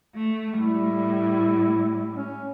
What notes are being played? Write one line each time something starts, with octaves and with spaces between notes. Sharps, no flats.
A3
A2 G3 E4
C#4